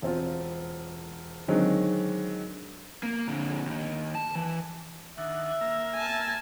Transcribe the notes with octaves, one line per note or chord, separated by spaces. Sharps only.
E1 C4 F4
D3 D#3 F#3 G#3 C4
A#3
A#2 D3
D#2
A5
E3
D#3 D4 E5 F#5
A#3 A#4 E6
G#5 A5